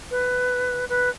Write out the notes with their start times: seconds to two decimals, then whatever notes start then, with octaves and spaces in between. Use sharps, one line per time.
0.11 B4
0.89 B4